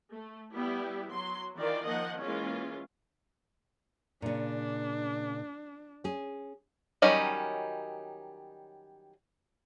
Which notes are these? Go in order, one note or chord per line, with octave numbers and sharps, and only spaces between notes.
A3
G3 B3 E4 G4
F#3 C6
D#3 E3 F4 A#4 D5
D#3 F3 A#3 D#5 F#5
E3 G#3 A#3 C#4 F4
A#2 C#3 D4
C#4 G#4
D#3 F#3 G3 C#4 D#4